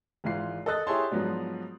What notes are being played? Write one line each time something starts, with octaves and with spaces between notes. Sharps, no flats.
G#1 G#2 E3 F4 C7
A4 D#5 D#6 F#6 A6
E4 G4 G#4 C#5 A5 C6
G#2 F3 F#3 B3 D4